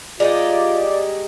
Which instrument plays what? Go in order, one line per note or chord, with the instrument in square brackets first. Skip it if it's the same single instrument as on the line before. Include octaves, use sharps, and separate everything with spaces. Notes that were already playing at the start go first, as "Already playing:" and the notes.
[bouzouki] G#3 D#4 G4 [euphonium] F4 [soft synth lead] D5